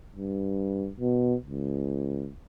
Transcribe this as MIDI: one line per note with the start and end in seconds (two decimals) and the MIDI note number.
0.16 0.89 43
1.00 1.35 47
1.46 2.29 37